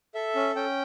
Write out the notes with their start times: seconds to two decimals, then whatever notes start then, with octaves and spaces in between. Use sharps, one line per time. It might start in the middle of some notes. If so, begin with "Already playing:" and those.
0.15 A4 E5
0.35 C#4
0.55 C#4 G5